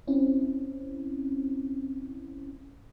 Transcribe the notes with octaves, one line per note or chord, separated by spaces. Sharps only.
C4 C#4 E4